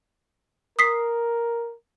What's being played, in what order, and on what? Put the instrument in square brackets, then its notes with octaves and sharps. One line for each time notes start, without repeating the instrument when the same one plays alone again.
[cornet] A#4 [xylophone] D#6 B6 C7